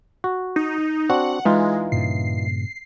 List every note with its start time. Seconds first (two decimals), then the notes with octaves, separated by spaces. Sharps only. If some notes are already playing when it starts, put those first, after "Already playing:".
0.24 F#4
0.56 D#4
1.10 C4 D4 F#4 F#5
1.45 E3 G#3 D#4 F4
1.92 G2 A#2 C#3 C7